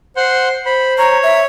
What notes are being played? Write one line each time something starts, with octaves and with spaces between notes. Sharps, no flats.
C5 F#5 C6
C5 B5
C#5 A#5
E5